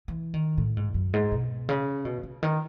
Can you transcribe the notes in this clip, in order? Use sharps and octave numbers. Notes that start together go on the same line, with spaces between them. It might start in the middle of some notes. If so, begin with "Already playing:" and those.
E3
D#3
A2
G#2
F#2
G#2
B2
C#3
B2
C#3
D#3